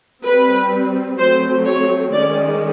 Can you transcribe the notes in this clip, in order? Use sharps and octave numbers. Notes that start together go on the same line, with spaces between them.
G3 C4 B4
F#3 A3 C4 C5
C#5
D#3 G#3 C#4 D5